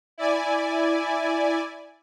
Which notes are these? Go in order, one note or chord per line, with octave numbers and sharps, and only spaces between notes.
E4 D5 G#5